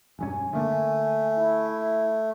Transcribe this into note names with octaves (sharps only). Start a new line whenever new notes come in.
E1 G2 C#4 G#5
D3 A3 A#3 D4
E4